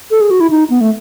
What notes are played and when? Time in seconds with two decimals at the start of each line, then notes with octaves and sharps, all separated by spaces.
0.11 A4
0.21 G#4
0.31 F#4
0.40 E4
0.50 D#4
0.70 B3
0.81 A3